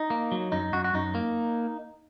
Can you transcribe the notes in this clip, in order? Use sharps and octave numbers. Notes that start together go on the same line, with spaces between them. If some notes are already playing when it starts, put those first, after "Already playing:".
Already playing: D#4
A#3
F#3
F#2 D#4
F#2 F#4
F#4
F#2 D#4
A#3